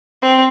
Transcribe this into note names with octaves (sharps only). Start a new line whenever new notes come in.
C4